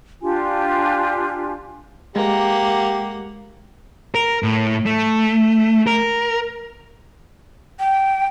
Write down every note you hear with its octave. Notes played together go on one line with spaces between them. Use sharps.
D4 F4 G4 G#5
G#3 A#3 G4 F#5
A#4
A2
A3
A#4
G5